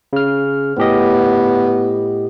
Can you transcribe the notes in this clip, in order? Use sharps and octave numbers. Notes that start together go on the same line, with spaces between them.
C#3 F6
A2 B3 G4 D#5